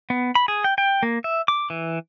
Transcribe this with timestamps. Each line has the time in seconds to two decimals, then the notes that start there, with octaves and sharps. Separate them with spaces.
0.10 B3
0.35 B5
0.48 G#4
0.64 G5
0.78 G5
1.03 A#3
1.24 E5
1.48 D6
1.70 E3